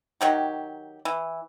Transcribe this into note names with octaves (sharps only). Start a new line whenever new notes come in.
D#3 F#3 G4
E3